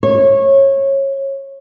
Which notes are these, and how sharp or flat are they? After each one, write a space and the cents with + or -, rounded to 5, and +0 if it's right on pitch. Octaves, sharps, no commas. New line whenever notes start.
C#5 -20